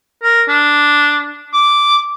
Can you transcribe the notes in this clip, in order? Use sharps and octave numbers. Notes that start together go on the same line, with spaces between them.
A#4
D4
D6